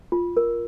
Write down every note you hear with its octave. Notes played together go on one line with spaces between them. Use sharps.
F4
A#4